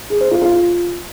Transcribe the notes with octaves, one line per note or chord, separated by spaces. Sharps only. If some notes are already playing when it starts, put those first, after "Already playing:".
G#4
C5
F4
F4